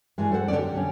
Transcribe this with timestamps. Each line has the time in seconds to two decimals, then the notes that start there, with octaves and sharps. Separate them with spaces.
0.18 G2 E3 G#3
0.32 A4 C5 C#5 F#5
0.48 D3 D#3 A#3 C#4 D5
0.59 G4
0.74 D3 A3 C#4